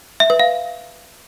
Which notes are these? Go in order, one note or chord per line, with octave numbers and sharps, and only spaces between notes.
E5
B4
F5